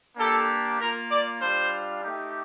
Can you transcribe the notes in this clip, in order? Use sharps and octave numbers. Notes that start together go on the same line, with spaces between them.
A#3 D4 G4 A4
A#3 F4 A#4
D5
G3 D4 F4 C5
A3 D#4 G4